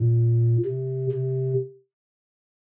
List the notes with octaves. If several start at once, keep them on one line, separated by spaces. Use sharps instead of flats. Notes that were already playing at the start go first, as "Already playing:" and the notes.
Already playing: A#2
C3
C3